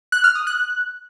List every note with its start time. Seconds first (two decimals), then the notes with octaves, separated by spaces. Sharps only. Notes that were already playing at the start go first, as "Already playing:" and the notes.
0.12 F#6
0.24 F6
0.35 D#6
0.47 F#6